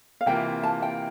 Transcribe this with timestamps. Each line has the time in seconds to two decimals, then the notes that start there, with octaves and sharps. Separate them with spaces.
0.21 F5
0.26 C3 E3 A#3 F4 G5
0.63 A5
0.82 G5